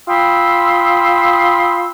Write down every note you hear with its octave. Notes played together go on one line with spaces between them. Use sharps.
F4 G5 B5 C6 D#6 E6